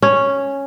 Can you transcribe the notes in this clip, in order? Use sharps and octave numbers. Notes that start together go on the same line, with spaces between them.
C#4